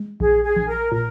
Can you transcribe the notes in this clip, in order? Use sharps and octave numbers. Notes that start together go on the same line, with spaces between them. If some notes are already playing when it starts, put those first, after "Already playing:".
Already playing: G#3
A#1 G#4
G#4
A#1
A#4
A#2 A#4